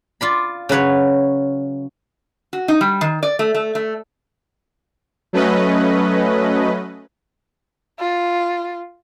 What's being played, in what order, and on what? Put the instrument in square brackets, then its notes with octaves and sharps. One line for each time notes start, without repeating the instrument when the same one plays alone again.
[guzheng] F4 D5 B5
C#3 F#3 B4 C#5
[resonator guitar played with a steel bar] F#4
D#4
G3
D#3
D5
A3
A3
A3
[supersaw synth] F#3 A3 C#4 B4 D#5
[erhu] F4